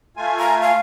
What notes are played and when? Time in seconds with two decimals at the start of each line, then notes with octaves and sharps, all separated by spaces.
0.17 A3 F4 G#5
0.40 A#5
0.62 F5